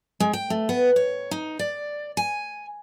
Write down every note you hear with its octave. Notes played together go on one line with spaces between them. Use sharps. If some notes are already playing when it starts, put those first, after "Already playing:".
G#3
G5
A3
B3
C#5
D#4
D5
G#5